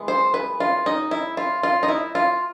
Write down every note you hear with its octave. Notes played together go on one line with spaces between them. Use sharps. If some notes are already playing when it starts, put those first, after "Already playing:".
Already playing: E3 G#3 B3
C5
B4
F4
D#4
E4
F4
F4
D#4
E4
F4